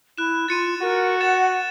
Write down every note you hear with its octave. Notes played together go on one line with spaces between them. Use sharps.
E4 F#6 E7
F4 A6 C#7 D#7
F#4 A#4
F#5 A6 E7